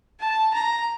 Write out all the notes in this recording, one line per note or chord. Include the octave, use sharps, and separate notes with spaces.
A5
A#5